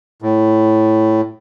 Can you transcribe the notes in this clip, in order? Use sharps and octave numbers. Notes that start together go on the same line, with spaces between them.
A2